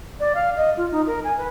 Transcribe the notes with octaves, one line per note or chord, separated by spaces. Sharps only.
D5
F5
D#5
F4
D#4
A#4
G#5
B4